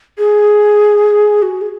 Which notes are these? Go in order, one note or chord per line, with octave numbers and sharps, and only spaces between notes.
G#4
F#4
G#4